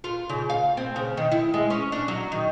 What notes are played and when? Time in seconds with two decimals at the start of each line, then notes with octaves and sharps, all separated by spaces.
0.04 F4
0.29 C#3
0.50 F5
0.77 C4
0.96 C#3
1.17 D#3
1.32 E4
1.54 G#3
1.70 C#4
1.92 D4
2.08 F#3
2.32 D#3